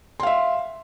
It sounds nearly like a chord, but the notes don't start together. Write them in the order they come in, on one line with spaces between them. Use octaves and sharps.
C6 F5 E5